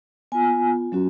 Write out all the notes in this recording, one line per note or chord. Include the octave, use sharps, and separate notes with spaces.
B3 F4 G#5
F#3 C#4 F#4